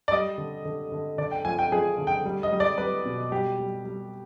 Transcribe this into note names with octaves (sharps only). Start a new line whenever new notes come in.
D5
G3 D#5
D3
D3
D3
D3 D5
G5
F3 G#5
G5
F3 G#4
D3
G5
G3
D#5
G3
D5
G3 B4
B2
G3 G4
G3
G3